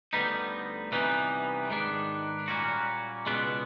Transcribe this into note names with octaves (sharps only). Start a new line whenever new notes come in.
D2 D3 G3 B3 D#4
C3 E3 G3 B3 D#4
G#2 D#3 G#3 B3 D4
A#2 G3 A#3 C#4 F#4
C#2 B2 G#3 B3 D4